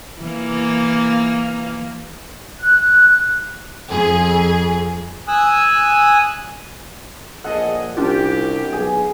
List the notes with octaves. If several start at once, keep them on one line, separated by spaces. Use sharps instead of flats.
E3 A#3
F#6
F2 G#4
G#5 D#6 E6 F#6
A#1 G#4 A4 D#5 F#5
C2 C#4 D4 F4 G4
B1 G#4